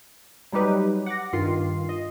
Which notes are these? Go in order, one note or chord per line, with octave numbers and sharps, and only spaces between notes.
F#3 G3 D#4 G4 B4
F#5 D6 A#6
G2 D#3 F4 C7
D#5